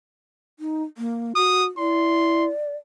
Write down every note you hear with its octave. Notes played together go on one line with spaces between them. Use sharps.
D#4
A#3
F#4 D#6
E4 D5 C6